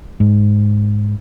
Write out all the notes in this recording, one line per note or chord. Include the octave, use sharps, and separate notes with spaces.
G#2